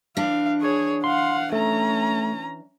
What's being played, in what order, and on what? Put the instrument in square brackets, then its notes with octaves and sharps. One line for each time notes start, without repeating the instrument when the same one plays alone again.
[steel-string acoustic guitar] E3 D4 [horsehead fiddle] F5
[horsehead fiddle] G#4 C#5
[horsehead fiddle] F5 F#5 [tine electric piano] C6
[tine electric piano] A3 [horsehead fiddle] C#4 A#5